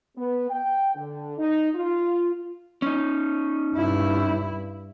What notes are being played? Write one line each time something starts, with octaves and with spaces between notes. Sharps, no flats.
B3
G5
D3
D#4
F4
C#4 D#4
G2 E4